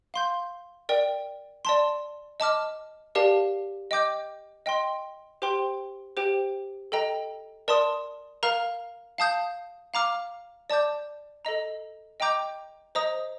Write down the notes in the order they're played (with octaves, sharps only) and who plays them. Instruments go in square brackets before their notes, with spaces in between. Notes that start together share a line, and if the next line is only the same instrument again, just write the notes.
[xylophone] F5 C6 G6
A#4 D5 G5
D5 A5 C6
D#5 A5 D6 F6
G4 A#4 D5 F5 A5
D#5 G5 D6 G6
D#5 G5 C6
G4 C5 G5 C6
G4 C5 G5
A4 D#5 G5 A#5
A#4 D5 A5 C6 D#6
A#4 F5 A#5 F6
F5 A5 D#6 G6
F5 A#5 D6 F6
D5 A5 D6 G6
A4 D#5 A#5
D#5 G5 A#5 D6 G6
C5 D#5 A#5 D#6